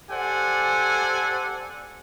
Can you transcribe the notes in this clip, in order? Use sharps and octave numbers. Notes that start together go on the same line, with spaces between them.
G4 A4 C5 D5 F#5 G#5